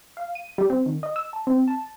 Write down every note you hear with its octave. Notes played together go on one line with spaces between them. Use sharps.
F5
D#7
G3
C4
D#3
D#5
E6
A5
C4
A5